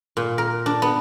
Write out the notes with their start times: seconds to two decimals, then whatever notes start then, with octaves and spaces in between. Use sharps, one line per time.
0.17 A#2
0.38 A#4
0.66 D4
0.82 B3